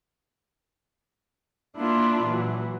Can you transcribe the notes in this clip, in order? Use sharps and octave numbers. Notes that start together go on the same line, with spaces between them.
A#3 D4 E4 F4
A#2 E3 F#3